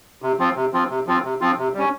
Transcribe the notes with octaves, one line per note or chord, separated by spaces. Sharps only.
C3
F3 C4 F4
C3
F3 C4 F4
C3
F3 C4 F4
C3
F3 C4 F4
C3
G3 C#4